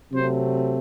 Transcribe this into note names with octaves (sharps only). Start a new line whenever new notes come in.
C3 F#3 A3 C4 C5